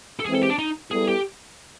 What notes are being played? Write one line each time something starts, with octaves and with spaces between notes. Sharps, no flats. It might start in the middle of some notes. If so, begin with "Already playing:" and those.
A4
E3 G#3 C4 G#4
A4
G4
D4
D#4
G3 B3 E4 G#4 A4
G4